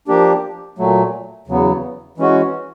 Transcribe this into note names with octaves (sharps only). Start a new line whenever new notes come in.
F3 A#3 D4 G4
A#2 F#3 A3
E2 C#3 F#3 B3
E3 G#3 C#4 F#4